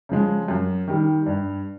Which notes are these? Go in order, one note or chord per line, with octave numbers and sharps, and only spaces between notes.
C#3 F3 G#3
F#2
D#3 G3
G2